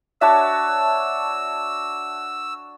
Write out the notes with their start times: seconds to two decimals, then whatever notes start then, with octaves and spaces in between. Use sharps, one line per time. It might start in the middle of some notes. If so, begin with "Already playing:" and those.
0.21 D4 F#4 C#5 E5 A5 E6